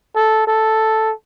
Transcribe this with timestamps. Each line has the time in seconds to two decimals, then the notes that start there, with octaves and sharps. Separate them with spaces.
0.16 A4
0.47 A4